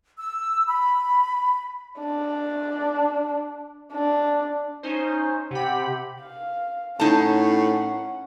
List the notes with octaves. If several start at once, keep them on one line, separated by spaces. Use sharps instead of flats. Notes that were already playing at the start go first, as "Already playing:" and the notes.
E6
B5
D4
D4
C#4 D#4 C5
C3 G4 F#5 B5
F5
A2 C#4 D#4 F#5 A5